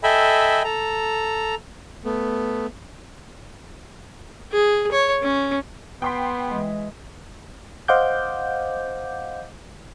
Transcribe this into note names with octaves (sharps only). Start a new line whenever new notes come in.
A4 D#5 E5 G5 G#5 B5
A4 A#5
A3 B3
G#4
C#5
C#4
B3 G5 C6 B6
E3 G#3
C5 D#5 F5 F#5 D6 G6